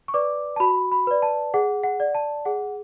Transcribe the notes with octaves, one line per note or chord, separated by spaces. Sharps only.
C#6
B4 D5 D6
A5
F#4 B5
B5
B4 D5
A5
G#4 F#5
F#5
D5
A5
G#4 F#5